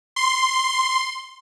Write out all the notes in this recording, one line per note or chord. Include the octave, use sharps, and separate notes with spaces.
C6